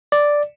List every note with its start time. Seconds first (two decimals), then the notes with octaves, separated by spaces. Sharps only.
0.12 D5